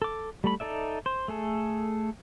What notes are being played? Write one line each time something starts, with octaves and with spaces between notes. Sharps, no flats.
A4 D6
G3 A3 B5
D#4 A4 D5 E5
C5
A3 G#4 A4